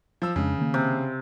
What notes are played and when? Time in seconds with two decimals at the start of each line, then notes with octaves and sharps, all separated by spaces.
0.22 F3 E6
0.36 F2 C#3 G#3 D4
0.58 D#3 A#3
0.74 C3